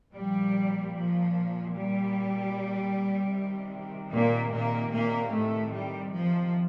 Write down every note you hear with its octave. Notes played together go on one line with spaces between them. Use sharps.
A#2 F3 G3
F3
G3
C3 D#3
A#2 A#3
A#2 A#3
A#2 A#3
A2 A3
G3
F3